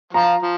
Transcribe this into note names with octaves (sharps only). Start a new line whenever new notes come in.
F3 F4 A#5
F3